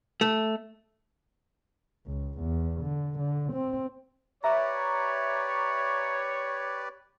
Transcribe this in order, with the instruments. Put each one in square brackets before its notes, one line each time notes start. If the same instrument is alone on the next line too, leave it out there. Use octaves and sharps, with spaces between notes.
[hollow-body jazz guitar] A3
[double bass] C#2
E2
D3
D3
C4
[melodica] G4 B4 D5 [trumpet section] C#5 [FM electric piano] E5 A#5